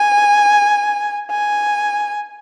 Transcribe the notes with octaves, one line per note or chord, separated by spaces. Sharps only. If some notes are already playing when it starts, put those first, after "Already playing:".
Already playing: G#5
G#5